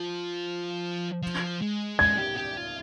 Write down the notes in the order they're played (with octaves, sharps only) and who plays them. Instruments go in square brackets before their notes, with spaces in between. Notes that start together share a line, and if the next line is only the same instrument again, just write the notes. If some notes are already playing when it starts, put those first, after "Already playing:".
Already playing: [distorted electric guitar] F3
F3
G#3
[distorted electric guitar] G#3 [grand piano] G#6
[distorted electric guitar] G#4
G4
G4
F4